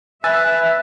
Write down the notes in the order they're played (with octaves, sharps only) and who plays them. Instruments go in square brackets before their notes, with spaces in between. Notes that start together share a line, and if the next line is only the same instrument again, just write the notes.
[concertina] B4 [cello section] E5 [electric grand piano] G#5 E6 A6